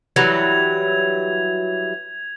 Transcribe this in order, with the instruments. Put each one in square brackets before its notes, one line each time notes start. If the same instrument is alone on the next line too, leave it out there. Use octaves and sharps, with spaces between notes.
[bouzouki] E3 F#3 G3 [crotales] G#6 F7